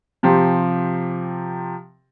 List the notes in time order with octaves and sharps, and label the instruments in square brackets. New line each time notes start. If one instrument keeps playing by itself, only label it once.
[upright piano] C3 F3 G4